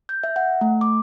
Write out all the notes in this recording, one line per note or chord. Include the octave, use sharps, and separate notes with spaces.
G6
E5
F#5
A3
D6